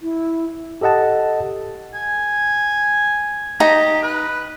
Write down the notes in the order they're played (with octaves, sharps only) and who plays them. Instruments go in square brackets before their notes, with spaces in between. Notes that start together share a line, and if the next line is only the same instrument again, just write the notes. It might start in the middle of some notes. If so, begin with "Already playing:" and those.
[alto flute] E4
[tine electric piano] G4 A4 D#5 F#5 A5
[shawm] G#5
[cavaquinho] D#4 A#5 [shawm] G4
[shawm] B4